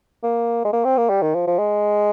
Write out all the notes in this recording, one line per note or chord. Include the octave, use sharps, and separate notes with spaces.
A#3
G#3
A#3
C4
A#3
G3
D#3
F3
F3
G#3